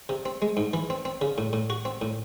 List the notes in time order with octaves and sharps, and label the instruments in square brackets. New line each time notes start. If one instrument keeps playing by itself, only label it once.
[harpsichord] C3
C4
G#3
G#2
E3
C4
C4
C#3
A2
A2
F#4
C4
A2